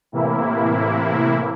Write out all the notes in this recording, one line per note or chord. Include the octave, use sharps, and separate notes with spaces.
A2 C3 E3 A#3 E4